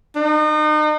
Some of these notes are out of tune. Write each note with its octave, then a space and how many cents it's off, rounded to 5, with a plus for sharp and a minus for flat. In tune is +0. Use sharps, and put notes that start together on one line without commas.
D#4 -35